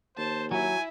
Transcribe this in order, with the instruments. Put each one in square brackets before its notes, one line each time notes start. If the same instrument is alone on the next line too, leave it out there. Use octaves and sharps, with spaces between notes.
[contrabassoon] D#2 [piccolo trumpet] C5 [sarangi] A5
[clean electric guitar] F#3 [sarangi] E4 [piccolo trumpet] G#5